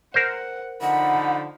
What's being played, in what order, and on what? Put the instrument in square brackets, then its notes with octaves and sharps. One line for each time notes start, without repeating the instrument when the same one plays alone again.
[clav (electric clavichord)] A#4 C5 [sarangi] F#5
[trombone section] D3 F3 D#4 [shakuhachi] F#5 [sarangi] B5